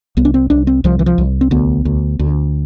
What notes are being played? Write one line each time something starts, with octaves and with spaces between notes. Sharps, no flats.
C2 B3
D4
C4
C2 D4
C4
C2 F3
E3
F3
C2
C4
D2 B3
D2
D2